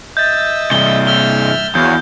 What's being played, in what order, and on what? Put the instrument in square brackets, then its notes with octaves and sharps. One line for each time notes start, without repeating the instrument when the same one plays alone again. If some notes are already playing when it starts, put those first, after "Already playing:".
[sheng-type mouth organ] D#5 E5 E6 [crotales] G6 A6
[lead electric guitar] G2 C3 [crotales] G7
[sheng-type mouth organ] E5 E6 F6 [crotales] G7
[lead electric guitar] E2 [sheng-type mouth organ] F#4 C#5 F5 [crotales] G6